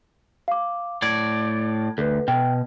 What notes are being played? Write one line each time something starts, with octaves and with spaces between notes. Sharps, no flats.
F5 D6
A2 D5 G#6
D2 A4 B4
B2 G5